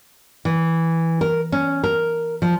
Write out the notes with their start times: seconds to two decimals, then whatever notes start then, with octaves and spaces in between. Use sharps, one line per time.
0.45 E3
1.21 A#4
1.52 C#4
1.84 A#4
2.42 F3